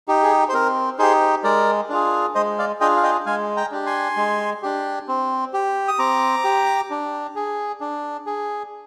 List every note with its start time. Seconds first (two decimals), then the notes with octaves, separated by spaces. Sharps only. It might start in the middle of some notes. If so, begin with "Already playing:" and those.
0.08 D#4 G4
0.23 G#4
0.49 C5
0.53 C4 A#4
0.99 D#4 G4 G#4 C5
1.44 G#3 A#4 D5
1.90 D4 F4 G#4
2.35 G#3 C5 D#5
2.59 D5 F5
2.81 D4 F4 G#4 D#5 G5
2.96 F5
3.03 D#5 G5
3.26 G#3 F5 G#5
3.57 G5 A#5
3.72 D4 G4
3.86 G#5 C6
4.17 G#3
4.63 D4 G4
5.08 C4
5.54 G4
5.88 D#6
5.99 C4 A#5 D6
6.44 G4
6.90 D4
7.36 G#4
7.81 D4
8.26 G#4